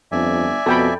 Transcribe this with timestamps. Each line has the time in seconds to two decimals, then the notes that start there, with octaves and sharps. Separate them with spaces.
0.12 G1 F2 D5 E5 G#5
0.66 F2 B2 A4 G5 B5